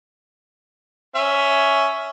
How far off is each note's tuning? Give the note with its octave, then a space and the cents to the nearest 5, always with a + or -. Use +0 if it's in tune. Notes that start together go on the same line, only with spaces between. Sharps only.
C#4 +10 E5 +0